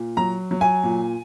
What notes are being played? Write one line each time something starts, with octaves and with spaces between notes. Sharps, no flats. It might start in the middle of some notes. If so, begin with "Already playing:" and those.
Already playing: A#2
F#3 A#5
F#3
G#5
A#2